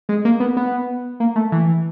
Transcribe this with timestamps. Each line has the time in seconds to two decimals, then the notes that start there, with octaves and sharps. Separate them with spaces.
0.09 G#3
0.25 A#3
0.40 B3
0.57 B3
1.20 A#3
1.36 A3
1.52 E3